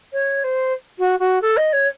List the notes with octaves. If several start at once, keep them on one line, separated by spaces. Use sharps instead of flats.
C#5
C5
F#4
F#4
A4
D#5
C#5